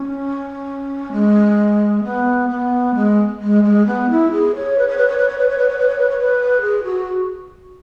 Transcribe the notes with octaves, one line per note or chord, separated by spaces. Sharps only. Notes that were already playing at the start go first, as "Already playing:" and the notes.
Already playing: C#4
G#3
B3
B3
G#3
G#3
G#3
B3
E4
G#4
C#5
B4
C#5
B4
C#5
B4
C#5
B4
C#5
B4
C#5
B4
C#5
B4
C#5
B4
G#4
F#4